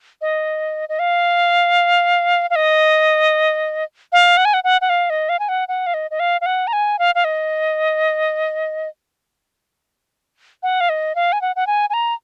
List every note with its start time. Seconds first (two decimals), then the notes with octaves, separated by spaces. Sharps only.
0.21 D#5
0.89 D#5
0.99 F5
2.50 F5
2.56 D#5
4.12 F5
4.37 F#5
4.45 G#5
4.54 F#5
4.64 F#5
4.81 F#5
4.90 F5
5.10 D#5
5.29 F5
5.39 G#5
5.49 F#5
5.68 F#5
5.86 F5
5.94 D#5
6.11 D#5
6.20 F5
6.41 F5
6.46 F#5
6.67 A#5
6.73 G#5
6.99 F5
7.15 F5
7.24 D#5
10.63 F#5
10.81 F5
10.89 D#5
11.15 F5
11.33 G#5
11.42 F#5
11.56 F#5
11.67 G#5
11.90 G#5
11.94 A#5